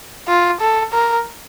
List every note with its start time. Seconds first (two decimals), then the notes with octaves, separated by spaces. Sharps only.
0.28 F4
0.60 A4
0.92 A#4